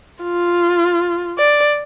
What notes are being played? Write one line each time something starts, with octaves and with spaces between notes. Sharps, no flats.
F4
D5